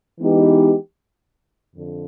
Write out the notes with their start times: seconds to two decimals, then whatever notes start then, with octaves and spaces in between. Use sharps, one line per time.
0.20 E3 G#3 B3 D#4 G4
1.76 F2 D3